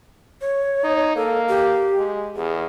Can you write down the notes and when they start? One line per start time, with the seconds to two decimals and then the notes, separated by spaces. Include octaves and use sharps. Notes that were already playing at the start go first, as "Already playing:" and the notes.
0.41 C#5
0.84 D#4
1.16 A#3 A4
1.49 G4
1.97 G#3
2.36 E2 G#4